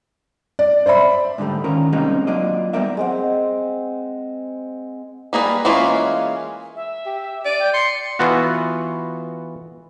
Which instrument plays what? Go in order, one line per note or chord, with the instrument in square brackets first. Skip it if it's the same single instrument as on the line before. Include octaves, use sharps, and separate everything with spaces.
[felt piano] D5
C5 D5 E5 B5
[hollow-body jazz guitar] G#2 D3 G3 A3
D#3 C#4 F4 A#4
C3 G3 G#3 A#3 C#4 D#4
F#3 A#3 D4 F4 D5 D#5
G3 B3 D#4 A#4 D5 E5
[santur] G#3 C4 F#5
[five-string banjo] G3 A#3 G#4 B4
E3 G#3 A#3 C#4 F4
[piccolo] E5
[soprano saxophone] G4
[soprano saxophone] D5 [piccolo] D#7
[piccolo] G5
[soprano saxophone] C6 [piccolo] C#7
[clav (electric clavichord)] E3 B3 F4 F#4